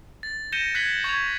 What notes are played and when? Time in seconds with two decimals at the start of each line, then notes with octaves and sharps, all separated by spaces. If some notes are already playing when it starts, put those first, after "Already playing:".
0.23 A6
0.52 G6 A#6 C#7 D#7 E7 G7
0.75 F#6 G#6 B6 C#7 F#7 G7
1.04 C#6 G#6 A#6 F7